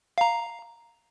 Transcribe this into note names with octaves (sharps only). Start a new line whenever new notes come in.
F5 A#5